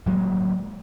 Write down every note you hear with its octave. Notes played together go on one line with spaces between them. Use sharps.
D1 F#3 G#3 A#3